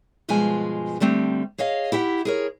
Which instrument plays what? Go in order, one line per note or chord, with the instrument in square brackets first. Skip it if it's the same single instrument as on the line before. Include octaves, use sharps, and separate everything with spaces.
[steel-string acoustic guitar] G2 B2 F3 G#3 F4 G#5
D3 G3 A3 C4
G#4 C#5 D#5 F5
E4 G4 E5 F#5
G#4 A#4 C#5